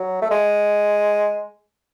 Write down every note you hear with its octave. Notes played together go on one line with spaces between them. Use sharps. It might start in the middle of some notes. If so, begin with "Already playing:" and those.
Already playing: F#3
A3
G#3